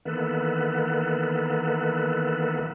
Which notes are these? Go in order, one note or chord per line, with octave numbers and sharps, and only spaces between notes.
D#3 E3 A#3 B3 A4 B4